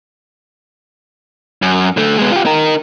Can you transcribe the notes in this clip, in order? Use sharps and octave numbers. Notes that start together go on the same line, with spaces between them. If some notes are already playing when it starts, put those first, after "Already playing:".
F#2
D3 A3
G#3 B3
F4 G4
D#4 A#4